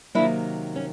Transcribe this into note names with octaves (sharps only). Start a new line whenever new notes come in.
C3 D#3 F#3 A#3 D4 E4
C#4